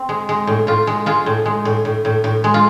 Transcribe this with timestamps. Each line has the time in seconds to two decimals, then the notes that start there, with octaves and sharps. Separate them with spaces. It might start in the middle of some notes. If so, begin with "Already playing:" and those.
Already playing: C4
0.09 G#3
0.29 G#3
0.47 A2
0.67 A2 F4
0.87 G#3
1.06 G#3 F4
1.26 A2
1.46 G#3
1.65 A2
1.85 A2
2.05 A2
2.24 A2
2.44 G#3
2.54 F4